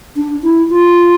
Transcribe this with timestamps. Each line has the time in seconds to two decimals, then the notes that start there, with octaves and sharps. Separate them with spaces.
0.16 D4
0.42 E4
0.70 F4